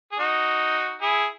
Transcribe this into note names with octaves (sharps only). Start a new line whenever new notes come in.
G#4
D#4 F#4
E4 G#4